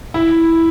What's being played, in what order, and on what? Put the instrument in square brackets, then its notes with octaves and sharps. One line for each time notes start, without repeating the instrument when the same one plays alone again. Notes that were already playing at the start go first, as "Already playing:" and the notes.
[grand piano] E4